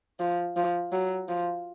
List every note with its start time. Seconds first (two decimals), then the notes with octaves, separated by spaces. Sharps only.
0.19 F3
0.56 F3
0.92 F#3
1.29 F3